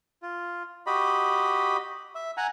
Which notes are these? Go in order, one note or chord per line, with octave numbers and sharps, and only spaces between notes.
F4
F#4 G4 D#5 B5
E5
F#5 G#5 A#5